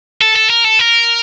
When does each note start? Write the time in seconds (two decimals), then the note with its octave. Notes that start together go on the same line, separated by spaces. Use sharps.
0.21 A4
0.36 A4
0.50 A#4
0.64 A4
0.79 A#4